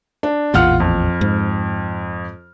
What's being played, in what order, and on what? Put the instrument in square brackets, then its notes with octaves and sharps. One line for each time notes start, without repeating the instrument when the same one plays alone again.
[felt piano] D4
[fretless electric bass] A1 E2 A#2 [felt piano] F4 F#5 F6
[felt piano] F2
[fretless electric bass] G#2